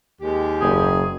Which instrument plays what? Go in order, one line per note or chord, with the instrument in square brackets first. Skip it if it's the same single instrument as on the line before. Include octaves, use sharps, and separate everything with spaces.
[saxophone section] D#2 G#3 G4
[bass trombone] F#1 [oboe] G#4